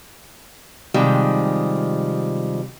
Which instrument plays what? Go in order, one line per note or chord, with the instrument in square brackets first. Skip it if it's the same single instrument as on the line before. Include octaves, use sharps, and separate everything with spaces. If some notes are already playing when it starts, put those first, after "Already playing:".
[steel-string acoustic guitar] C3 D#3 F3 G3 G#3